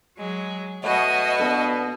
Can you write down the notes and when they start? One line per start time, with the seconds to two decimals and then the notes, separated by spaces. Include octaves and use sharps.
0.17 F#3 G#3
0.84 B2 A3 F#4 C#5 D#5
1.40 B3 D4 A4